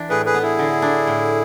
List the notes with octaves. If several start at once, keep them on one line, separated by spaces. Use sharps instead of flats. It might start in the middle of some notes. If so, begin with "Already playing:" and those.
Already playing: E3 D4
A2 G#4 B4
G#4 B4
B3
E4 G#4
D3
D4
A2